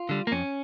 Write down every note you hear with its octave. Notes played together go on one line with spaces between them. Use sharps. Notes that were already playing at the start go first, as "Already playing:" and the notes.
Already playing: F4
D3 G3
A#3
F2 C#4